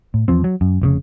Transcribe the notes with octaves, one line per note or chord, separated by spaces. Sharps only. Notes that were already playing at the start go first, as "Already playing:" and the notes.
A2
E2 F3 C4
F#3
F#2
F1 A#2 C#3